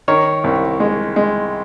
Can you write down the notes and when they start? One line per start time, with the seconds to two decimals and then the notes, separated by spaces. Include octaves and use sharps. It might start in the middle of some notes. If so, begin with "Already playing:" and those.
0.08 D#3 A#4 C#5
0.44 C2
0.80 G#3
1.16 G#3